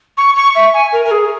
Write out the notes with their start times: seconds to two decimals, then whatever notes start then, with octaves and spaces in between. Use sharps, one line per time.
0.17 C#6
0.36 C#6
0.55 E5
0.73 G#5
0.92 A#4
1.04 A#4
1.10 G#4